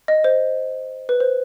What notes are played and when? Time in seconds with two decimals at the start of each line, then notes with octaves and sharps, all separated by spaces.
0.08 D#5
0.24 C5
1.09 B4
1.20 C5